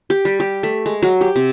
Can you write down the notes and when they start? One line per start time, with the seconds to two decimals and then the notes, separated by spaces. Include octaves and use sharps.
0.10 G4
0.25 G3
0.40 G4
0.63 A3
0.86 G#3
1.02 F#3
1.21 G4
1.36 C3